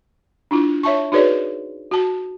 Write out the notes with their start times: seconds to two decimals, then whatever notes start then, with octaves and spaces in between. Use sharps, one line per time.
0.51 D4 E4 F4
0.83 C#5 E5 A5 C#6
1.12 D#4 F#4 G#4 B4 C#5 D5
1.91 F#4 A5